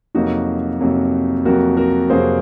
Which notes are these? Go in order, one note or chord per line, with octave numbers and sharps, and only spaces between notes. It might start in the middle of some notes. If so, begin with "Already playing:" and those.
F2 C3 F#3 A#3 D#4 F#4
F2 C3 F#3 A#3
F2 C3 F#3 A#3 F#4 A#4
F#4 A#4
F2 C3 F#3 A#3 G#4 C5